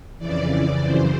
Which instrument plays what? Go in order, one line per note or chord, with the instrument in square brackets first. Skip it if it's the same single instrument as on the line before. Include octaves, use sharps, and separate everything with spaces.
[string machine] F2 C#3 E3 D5
F#2 C#3 E3 C5